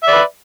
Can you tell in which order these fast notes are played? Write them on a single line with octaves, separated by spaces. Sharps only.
E5 D5 B4